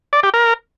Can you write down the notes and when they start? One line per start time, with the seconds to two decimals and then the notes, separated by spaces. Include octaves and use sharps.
0.13 D5
0.23 G4
0.34 A#4